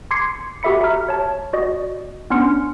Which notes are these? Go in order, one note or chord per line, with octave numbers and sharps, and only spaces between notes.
C6 D6 G#6 C7 C#7
F#4 G4 A4 E5 B5 C#7
E5 A#5 F6
C#5 A5
F#4 D5 D#5
B3 C#4 D4 C6 F6 C#7